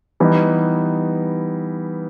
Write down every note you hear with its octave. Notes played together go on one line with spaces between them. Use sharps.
E3 G3 B3 D#4